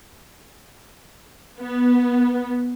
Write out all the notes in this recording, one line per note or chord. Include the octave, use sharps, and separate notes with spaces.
B3